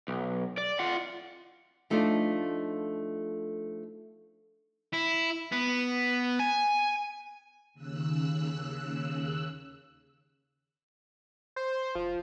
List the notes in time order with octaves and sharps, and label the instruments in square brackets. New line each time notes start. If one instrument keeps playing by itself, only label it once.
[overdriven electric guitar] B1
D5
F4 F#5
[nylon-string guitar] F3 A3 D4 D#4 F4 A4
[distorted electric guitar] E4
B3
G#5
[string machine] D#2 C#3 E6 F#6
[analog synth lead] C5
[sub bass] F1 [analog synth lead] F3